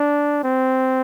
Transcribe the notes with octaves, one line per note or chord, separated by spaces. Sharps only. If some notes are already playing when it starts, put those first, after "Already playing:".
Already playing: D4
C4